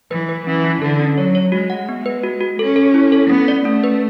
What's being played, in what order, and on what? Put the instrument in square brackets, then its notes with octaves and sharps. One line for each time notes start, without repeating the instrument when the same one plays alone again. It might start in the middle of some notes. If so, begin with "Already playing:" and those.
[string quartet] E3 [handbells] B4
[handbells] B4
[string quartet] E3 [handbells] C#4
[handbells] E4
[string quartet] D3 [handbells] A4
[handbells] C#4
[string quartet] F#3 [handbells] C#5
[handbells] C#5
[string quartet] G#3 [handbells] F#4
[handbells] F#5
B3
B4
F#4
F#4
[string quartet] C#4 [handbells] A4
[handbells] A4
E4
A4
[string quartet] B3 [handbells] C#4
[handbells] D5
[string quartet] A3 [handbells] C#4
[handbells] B4